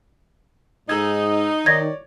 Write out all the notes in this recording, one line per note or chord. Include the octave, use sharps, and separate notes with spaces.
G#2 D#4 G#4 E6 G#6
D#3 C#5 D5 G#6 A#6